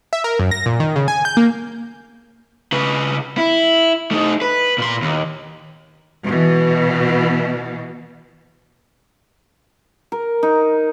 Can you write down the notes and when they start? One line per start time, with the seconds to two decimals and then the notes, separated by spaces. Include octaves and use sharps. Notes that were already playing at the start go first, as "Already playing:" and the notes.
0.13 E5
0.24 A#4
0.39 F#2
0.51 A#6
0.66 A#2
0.80 D#3
0.96 C#3
1.08 G#5
1.25 G6
1.37 A#3
2.72 C#3 B4
3.38 E4
4.11 A3 D#4
4.42 B4
4.78 A#2 C6
5.02 D#2
6.26 B2 E3
10.12 A#4
10.43 D#4